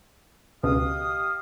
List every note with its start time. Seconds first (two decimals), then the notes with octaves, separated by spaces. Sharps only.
0.64 C#2 B2 G4 D#5 F5 D#6